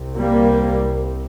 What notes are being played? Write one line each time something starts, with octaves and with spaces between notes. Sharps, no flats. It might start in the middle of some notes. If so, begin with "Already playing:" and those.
Already playing: C2 C3
G3 A#3